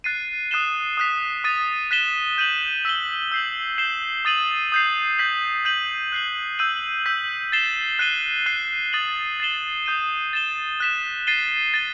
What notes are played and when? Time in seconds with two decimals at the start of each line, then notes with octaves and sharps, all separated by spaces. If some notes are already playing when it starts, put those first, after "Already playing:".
0.04 F#6 A6 C7 D#7
0.51 D#6 F#6 C7 E7 G7
0.97 D#6 F#6 B6
1.44 D#6 A6 D#7
1.91 F#6 B6 E7 G7
2.38 G6 D#7 F#7
2.85 E6 B6 D#7 G7
3.32 E6 G6 C7 F#7
3.78 G6 C7 E7 G7
4.25 D#6 A6 D#7 F#7
4.72 D#6 G6 C7
5.19 G6 B6 F#7
5.65 G6 D#7 F#7
6.12 F#6 C7 F#7
6.59 E6 G6 D#7 F#7
7.06 E6 G6 B6
7.52 A6 C7 E7 G7
7.99 F#6 C7 D#7 G7
8.46 F#6 C7 D#7 G7
8.93 D#6 A6 D#7 F#7
9.40 A6 C7 E7 G7
9.86 D#6 G6 D#7
10.33 A6 E7 G7
10.80 F#6 B6 E7
11.27 A6 C7 D#7 G7
11.74 A6 D#7 G7